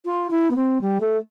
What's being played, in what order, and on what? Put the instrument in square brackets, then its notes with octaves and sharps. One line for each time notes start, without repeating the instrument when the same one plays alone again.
[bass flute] F4
E4
B3
C4
G3
A3